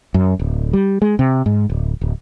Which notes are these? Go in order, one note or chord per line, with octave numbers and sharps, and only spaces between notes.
F#2
D1
G3
G#3
C3
G#2
D1
D1